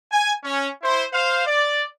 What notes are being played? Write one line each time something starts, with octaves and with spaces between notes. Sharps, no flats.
G#5
C#4
E4 C5
C5 F5
D5